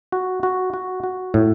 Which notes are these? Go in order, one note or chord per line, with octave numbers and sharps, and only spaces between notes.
F#4
F#4
F#4
F#4
A2